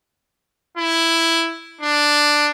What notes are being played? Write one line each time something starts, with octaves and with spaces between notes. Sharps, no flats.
E4
D4